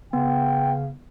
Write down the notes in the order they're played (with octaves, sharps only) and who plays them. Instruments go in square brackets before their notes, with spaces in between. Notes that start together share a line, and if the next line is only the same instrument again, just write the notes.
[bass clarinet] C#3 [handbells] B3 [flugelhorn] G5